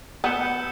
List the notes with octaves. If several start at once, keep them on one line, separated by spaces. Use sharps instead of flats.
B3 E6 G6 C#7 E7 G7